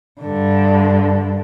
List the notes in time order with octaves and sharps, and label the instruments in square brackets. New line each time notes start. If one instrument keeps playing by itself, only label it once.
[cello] G2 D3